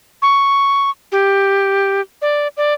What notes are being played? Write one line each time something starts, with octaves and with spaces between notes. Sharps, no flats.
C#6
G4
D5
D5